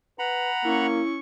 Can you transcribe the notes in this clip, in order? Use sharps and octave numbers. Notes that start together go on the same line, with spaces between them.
B4 F#5 A#5 B5
A#3 C#4 E4 C#6